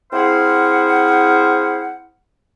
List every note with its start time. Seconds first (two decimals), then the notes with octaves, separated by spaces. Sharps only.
0.12 C4 E4 G#4 C5 F5 F#5